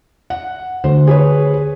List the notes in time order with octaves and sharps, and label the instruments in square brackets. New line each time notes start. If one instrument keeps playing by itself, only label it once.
[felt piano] F#5
[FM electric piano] D2 [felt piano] C5
[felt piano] G#4 B4 C#5